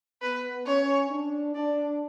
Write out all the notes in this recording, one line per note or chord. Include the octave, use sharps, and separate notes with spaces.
B3 B4
C#4 C#5
D4
D4 D5